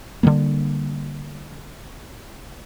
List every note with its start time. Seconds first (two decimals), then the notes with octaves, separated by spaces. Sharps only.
0.23 D3 F3 G3 A#3